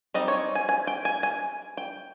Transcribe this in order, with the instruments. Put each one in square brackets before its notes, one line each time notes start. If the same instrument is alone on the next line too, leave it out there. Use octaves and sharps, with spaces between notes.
[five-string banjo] G3 C4 D#4 D#5
C#5
G#5
G#5
G5
G#5
G#5
G5